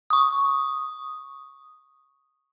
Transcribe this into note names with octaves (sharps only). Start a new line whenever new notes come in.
C#6 D#6